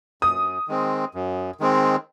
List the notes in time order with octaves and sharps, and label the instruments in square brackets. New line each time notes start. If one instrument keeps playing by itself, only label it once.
[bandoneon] F#2 [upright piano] D#6
[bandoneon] D#3 G#3 C4
F#2
D#3 G#3 C4